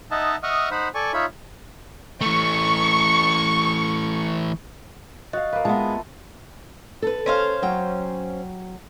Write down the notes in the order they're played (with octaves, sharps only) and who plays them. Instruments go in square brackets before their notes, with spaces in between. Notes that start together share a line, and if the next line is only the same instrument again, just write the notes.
[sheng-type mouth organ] D#4 D#5 E5 F#5 A5
D#5 E5 F#5 C#6 D#6 F6
D#4 C5 F#5 B5
A4 D5 G#5 C#6
D#4 F4 C#5 E5 B5
[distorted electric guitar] E3 A3 [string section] C#6
[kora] F#4 F5 [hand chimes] D#5
[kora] A#3 B4 [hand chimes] F5
[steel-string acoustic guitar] G#3 B3 [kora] F4 [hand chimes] E5 A5
[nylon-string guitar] A4 B4
[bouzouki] C#4 C5 F5
[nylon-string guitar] F#3 G5